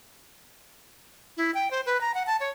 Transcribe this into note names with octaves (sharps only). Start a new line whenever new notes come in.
E4
G5
C5
B4
A#5
F#5
A5
C#5